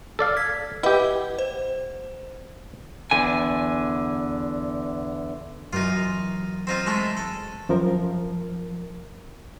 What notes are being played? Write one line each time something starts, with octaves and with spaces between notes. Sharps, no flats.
A4 D5 F5
G#6 B6
E4 G4 B4 D#5 F#5
C5
E2 D3 G#5
F#2 E3 D#4 F4
C4 D#4 F4
G#3 A3 E4
A4
F#2 F3 A#4